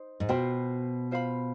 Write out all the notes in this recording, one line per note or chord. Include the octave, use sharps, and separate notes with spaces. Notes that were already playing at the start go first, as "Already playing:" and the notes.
Already playing: D#4 C5
G#2
B2 F4 C5 G5 B5
F4 C5 F5 B5